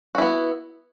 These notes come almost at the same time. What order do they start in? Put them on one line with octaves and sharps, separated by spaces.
F#4 E4 B3